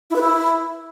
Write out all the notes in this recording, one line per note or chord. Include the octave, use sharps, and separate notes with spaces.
E4
B4
E4